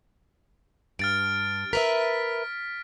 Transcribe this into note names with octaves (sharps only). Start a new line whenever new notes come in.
G2 F6 A6 D7
A#4 B4 E5 B6